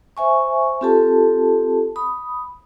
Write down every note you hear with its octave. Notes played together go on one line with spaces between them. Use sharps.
C5 E5 G#5 C#6
C4 F4 G4 A4 A5
B5 D#6